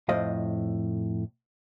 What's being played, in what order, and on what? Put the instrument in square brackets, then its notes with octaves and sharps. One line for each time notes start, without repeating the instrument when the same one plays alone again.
[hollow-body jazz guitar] F2 A2 C5 D#5 F5